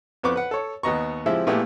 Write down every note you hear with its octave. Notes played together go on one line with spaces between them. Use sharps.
F2 B3 B4 C5 C#6 D6
B4 F#5
A4 C#5
D#2 B3 D#5 A#5 C#6
F3 G#3 C4 E4 G4 E5
A#2 A3 B3 E4 G4 G#4